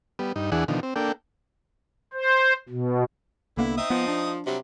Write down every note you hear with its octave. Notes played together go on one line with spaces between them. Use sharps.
G3 B3
G2 D#4
E2 E3 D4 G#4 F#5
B2 D3 D#3 F3
C4
A#3 D4 A4 G5
C5
B2
C2 D3 A#3 B3 E4
C4 D#4 E5 D#6
F3 B3
D4
C3 F#3 G3